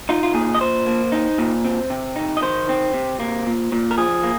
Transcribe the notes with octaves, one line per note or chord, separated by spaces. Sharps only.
D#4 F4
F4
A#2 G#4
D#5
A#2 C5
A#3
D#4
A#2
C4
C3
D#4
D#5
D#3 C5
C4
C3
A#3
A#2
A#2
A#4
F3 G#4
A#3